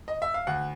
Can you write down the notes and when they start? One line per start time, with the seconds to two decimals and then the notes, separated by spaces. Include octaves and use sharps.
0.08 D#5
0.22 E5
0.34 F5
0.47 D2 F#5